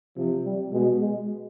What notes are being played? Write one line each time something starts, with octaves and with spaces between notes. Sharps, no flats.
C3 F3
G3
B2 G#3
G#3